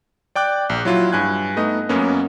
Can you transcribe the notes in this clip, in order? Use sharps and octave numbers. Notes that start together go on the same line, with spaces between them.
D5 G5 D6 F#6
A#1
F#3 E4 F4
G2 G#5 F#6 G#6
A3 B3 D#4 D#5
F#2 A#3 B3 C#4